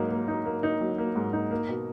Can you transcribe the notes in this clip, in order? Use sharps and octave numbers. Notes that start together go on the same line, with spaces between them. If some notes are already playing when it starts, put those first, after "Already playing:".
Already playing: G#2 F#3 A#3 D#4
A#3
D#4
A#3
D#4
F#3
A#3
G#2
D#4
A#3
B2